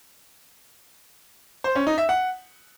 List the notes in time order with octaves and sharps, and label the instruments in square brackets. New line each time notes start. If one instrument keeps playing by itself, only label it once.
[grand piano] C5
C#4
D#4
E5
F#5